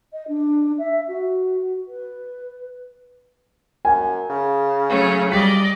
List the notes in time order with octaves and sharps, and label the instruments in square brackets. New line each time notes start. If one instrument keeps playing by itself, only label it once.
[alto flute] D#5
D4
E5
F#4
B4
[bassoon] F#2 [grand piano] G#5
[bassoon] C#3
[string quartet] F#3 A3 C#4
[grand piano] G3 B6 [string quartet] D5 D#5 D6